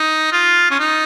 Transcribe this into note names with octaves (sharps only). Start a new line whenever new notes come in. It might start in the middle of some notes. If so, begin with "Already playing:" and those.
Already playing: D#4
F4
C#4
D#4